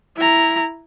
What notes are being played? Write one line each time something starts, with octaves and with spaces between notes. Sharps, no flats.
E4 A#5